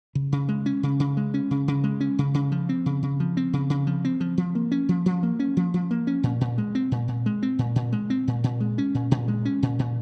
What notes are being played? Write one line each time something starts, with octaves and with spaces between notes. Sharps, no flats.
C#3
C#3
G#3
C#4
C#3
C#3
G#3
C#4
C#3
C#3
G#3
C#4
C#3
C#3
F3
C4
C#3
C#3
F3
C4
C#3
C#3
F3
C4
F3
F3
A#3
C#4
F3
F3
A#3
C#4
F3
F3
A#3
C#4
A#2
A#2
G#3
C4
A#2
A#2
G#3
C4
A#2
A#2
G#3
C4
A#2
A#2
G#3
C#4
A#2
A#2
G#3
C#4
A#2
A#2